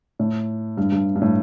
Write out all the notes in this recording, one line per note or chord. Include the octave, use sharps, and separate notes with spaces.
A2
G2
G2
G2
A2